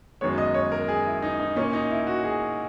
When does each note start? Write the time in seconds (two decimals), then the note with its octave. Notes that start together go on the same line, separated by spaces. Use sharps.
0.21 F#2 D#3 G#3 B3 C#5
0.38 D#5
0.54 C#5
0.72 A#4
0.88 G#4
1.06 E4
1.22 D#4
1.40 D#4
1.56 A#2 A#3 C#4
1.73 D#4
1.90 E4
2.07 F#4
2.24 G#4